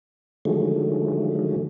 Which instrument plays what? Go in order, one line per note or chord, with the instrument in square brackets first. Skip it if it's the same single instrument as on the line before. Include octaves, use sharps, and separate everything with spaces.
[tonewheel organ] D3 D#3 F3 F#3 G#3 A3